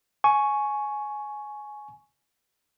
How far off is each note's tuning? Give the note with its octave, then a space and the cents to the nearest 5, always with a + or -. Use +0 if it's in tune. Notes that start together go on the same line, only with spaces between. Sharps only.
G#5 +15 C#6 +0